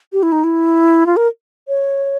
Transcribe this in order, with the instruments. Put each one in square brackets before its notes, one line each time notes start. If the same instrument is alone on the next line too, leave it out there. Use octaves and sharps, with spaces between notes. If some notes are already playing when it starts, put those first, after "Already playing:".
[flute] G4
E4
D#4
E4
F4
A#4
C#5